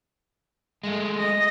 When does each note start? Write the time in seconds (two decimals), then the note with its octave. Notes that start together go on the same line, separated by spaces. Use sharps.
0.83 G#3 A3
1.19 D#5 A#6